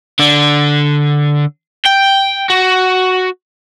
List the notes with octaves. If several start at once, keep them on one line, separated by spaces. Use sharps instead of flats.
D3 D4
G5
F#4